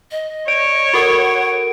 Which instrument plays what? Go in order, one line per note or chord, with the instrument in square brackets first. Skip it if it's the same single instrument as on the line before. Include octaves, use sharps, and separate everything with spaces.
[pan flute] D#5
[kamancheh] C#5 [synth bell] D5 [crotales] D7
[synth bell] F#4 A4 A#4 [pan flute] F#5